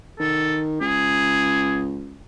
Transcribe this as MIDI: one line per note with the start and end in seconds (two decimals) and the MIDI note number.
0.20 0.78 51
0.20 0.59 69
0.81 2.22 37
0.81 1.82 68